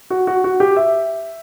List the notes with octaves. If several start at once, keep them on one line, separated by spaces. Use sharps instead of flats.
F#4
F#4
F#4
G4
E5